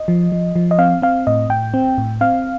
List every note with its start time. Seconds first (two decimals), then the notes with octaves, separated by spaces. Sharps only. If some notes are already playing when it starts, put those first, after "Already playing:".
Already playing: D#5
0.08 F3
0.32 F3
0.56 F3
0.71 D#5
0.79 C4 F5
1.02 C4 F5
1.27 A2 D#5
1.50 A2 G5
1.74 C4
1.98 A2
2.21 C4 F5